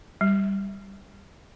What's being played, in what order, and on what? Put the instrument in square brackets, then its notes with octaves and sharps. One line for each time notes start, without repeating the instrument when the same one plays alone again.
[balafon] G3